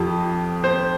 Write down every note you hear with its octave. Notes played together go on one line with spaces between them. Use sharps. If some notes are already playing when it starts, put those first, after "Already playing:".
Already playing: F2 F3 G4
C5